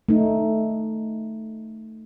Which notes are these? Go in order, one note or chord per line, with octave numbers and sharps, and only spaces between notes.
A3 D#4